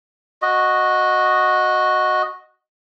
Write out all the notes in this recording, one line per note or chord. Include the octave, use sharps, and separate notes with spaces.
F#4 D#5